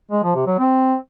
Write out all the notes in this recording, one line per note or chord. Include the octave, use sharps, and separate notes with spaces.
G#3
F3
C3
F#3
C4